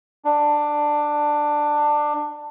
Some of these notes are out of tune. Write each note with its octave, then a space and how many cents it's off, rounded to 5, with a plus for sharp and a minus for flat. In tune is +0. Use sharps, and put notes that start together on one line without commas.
D4 +10